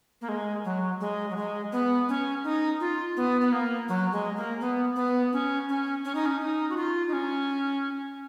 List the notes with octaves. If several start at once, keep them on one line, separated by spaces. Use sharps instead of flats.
A#3
G#3
F#3
G#3
F#3
G#3
B3
C#4
D#4
F4
B3
B3
A#3
F#3
G#3
A#3
B3
B3
C#4
C#4
C#4
D#4
C#4
D#4
F#4
F4
D#4
C#4